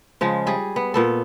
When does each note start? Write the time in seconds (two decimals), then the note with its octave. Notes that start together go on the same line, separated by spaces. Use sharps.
0.21 C#3 F3 G#3
0.47 G3 G#4
0.76 B3
0.94 A#2 B3 A4